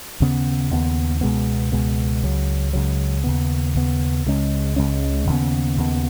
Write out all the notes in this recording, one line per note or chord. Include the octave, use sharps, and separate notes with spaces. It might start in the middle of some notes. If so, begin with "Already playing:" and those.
D#2 C#3 B3
D#2 C#3 B3
C#2 B2 G#3 B3
C#2 B2 G#3 B3
C#2 C#3 F#3
C#2 C#3 F#3
D#2 C#3 B3
D#2 C#3 B3
C#2 C#3 G#3 C#4
C#2 C#3 G#3 C#4
D#2 C#3 B3
D#2 C#3 B3